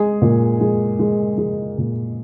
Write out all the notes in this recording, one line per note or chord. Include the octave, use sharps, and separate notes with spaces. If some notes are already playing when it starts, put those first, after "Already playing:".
Already playing: G#3 G#4
A#2
G#3
G#3
G#3
A#2